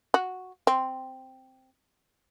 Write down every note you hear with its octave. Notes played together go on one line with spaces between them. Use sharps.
F#4
C4